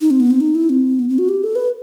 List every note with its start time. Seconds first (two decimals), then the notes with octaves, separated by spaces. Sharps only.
0.01 D#4
0.11 C4
0.20 B3
0.31 C4
0.40 D#4
0.55 E4
0.70 C4
0.99 B3
1.09 C4
1.18 F#4
1.29 G4
1.44 A4
1.56 B4